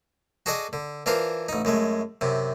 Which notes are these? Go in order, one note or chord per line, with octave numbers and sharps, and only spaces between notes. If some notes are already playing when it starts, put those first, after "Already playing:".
F#4 G#4 A4 D5 D#5 F#5
D3
E3 D4 F4 A#4 C5
A1 D#4
F#2 G#3 A3
F#2 C3